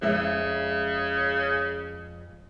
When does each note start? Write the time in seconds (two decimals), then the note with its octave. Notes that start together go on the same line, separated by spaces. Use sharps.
0.02 F2 C#3 G#3 E5